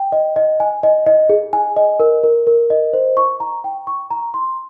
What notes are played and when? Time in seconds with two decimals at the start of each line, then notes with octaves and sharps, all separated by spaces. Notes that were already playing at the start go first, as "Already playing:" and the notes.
Already playing: G5
0.12 D#5
0.36 D#5
0.60 G#5
0.83 D#5
1.06 D#5
1.29 G#4
1.53 G#5
1.77 D#5
2.00 A#4
2.23 A#4
2.47 A#4
2.70 D#5
2.93 C5
3.17 C#6
3.40 A#5
3.64 G5
3.87 C#6
4.11 A#5
4.34 C6